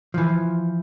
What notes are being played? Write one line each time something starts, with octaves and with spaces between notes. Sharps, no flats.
E3 F3